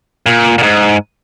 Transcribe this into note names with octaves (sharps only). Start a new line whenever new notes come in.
A#2
A#2
G#2